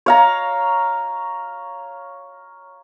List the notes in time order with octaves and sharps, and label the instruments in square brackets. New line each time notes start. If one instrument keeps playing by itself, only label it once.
[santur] C#5 F5 A#5